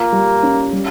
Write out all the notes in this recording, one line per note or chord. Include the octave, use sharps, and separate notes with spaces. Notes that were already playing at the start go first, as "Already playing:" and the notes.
Already playing: A#3 F4
G3
C#4
G3